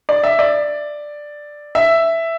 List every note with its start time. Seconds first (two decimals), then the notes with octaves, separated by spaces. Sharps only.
0.09 D5
0.24 E5
0.39 D5
1.75 E5